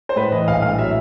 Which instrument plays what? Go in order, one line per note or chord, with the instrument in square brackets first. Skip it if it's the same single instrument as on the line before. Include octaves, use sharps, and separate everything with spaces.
[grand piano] C5
A2 B4
E3 D#5
A#1 F5
A2 F5
F#3 E5